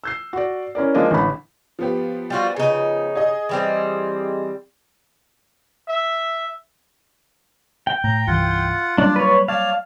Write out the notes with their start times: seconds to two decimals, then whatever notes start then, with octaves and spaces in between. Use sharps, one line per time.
0.04 E6 G6 C7
0.33 F#4 D5
0.75 C#4 E4 A#4 D5
0.94 F3 G#3 A#3 D4 D#5
1.11 A1 D3 B5
1.79 F3 B3 G4
2.30 G3 F4 F#4
2.56 C#3 D#4
3.15 G#4 D#5
3.49 E3 G3 C4
5.89 E5
7.87 G5
8.04 A2 A#5
8.27 C2 G2 E3 F4 F#5
8.98 F#3 G3 A#3 D4 F4 D5
9.16 B4 C#5
9.48 C#5 D5 F5 A5